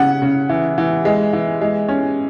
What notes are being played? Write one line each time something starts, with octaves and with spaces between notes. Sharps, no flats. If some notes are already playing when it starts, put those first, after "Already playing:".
Already playing: C#3 C#4 F#5
C#3
E3
E3
G#3
E3
G#3
C#4